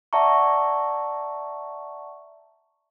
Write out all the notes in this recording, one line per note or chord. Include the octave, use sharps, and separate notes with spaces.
D5 E5 F#5 A5 A#5 C#6